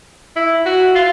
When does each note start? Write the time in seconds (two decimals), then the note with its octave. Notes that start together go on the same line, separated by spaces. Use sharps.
0.36 E4
0.66 F#4
0.95 F4